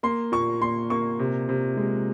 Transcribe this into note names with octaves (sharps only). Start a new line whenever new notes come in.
A#3 C6
A#2 C#6
A#2 C6
A#3 C#6
C3
C3
G#3